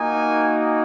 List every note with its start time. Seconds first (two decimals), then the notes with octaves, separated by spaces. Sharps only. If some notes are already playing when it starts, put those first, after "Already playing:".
Already playing: A#3 D#4 F#4 G#5